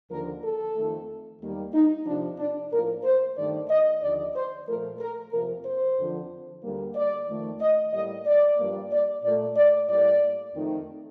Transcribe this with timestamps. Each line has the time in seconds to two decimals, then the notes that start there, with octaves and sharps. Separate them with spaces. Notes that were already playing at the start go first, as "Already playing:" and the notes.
0.10 D#2 D3 F3 A#3 A#4
0.44 A4
0.76 F2 D#3 A3
1.41 D#2 D#3 G3 A#3
1.74 D#4
2.07 F2 C3 F3 D4
2.39 D4
2.71 A2 F3 A#3 A#4
3.04 C5
3.37 G2 D#3 A3 D5
3.69 D#5
4.02 D#2 D3 F3 D5
4.35 C5
4.68 A#2 F3 A3 A#4
5.00 A#4
5.32 F2 C3 F3 A#3 A#4
5.65 C5
5.98 F2 D3 F3
6.63 D2 D3 G3 A#3
6.95 D5
7.28 F2 D#3 A3
7.61 D#5
7.93 A2 G3 A#3 D#5
8.26 D5
8.59 G2 F3 A#3
8.92 D5
9.24 A#2 A3 D5
9.56 D5
9.89 A2 G3 A#3 D5
10.54 F2 D#3 A3